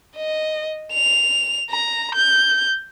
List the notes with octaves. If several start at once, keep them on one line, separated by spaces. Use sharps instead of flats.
D#5
F7
A#5
G6